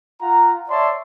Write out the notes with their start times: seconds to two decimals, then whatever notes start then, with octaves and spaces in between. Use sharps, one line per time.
0.22 F4 F#5 A#5
0.70 C#5 D5 E5 A5 C6